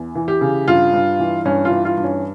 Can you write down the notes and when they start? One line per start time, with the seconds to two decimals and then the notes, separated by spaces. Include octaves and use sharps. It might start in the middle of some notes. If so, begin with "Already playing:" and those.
Already playing: E2
0.15 E3
0.28 G4
0.41 C#3
0.68 G2 F4
0.93 G2
1.19 E3
1.45 G2 C#4
1.65 F4
1.71 E3
1.85 F4
1.97 G2
2.04 C#4